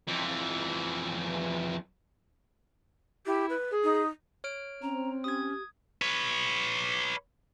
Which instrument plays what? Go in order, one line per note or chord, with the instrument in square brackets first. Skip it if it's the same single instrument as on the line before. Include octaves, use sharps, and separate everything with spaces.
[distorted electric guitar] F2 E3
[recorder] E4 [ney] G4
[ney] B4
[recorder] G#4
[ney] D#4
[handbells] C#5 F6 D7
[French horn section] C4 [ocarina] C#4 [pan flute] A#5
[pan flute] C#4 [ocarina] G4 [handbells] D#6 G#6
[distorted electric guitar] B4 C#5